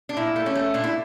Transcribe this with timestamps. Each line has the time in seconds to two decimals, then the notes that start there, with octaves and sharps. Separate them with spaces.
0.09 D4
0.17 A#2 E4
0.36 A3
0.46 C#4
0.55 A3
0.74 A#2 D4
0.84 E4